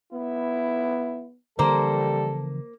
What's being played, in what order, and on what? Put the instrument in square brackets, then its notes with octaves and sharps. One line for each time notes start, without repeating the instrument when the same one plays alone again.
[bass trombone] B3 [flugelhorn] E4
[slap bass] C#3 E3 F3 [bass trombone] G3 [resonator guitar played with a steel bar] A#3 A#4 C5 [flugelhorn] A4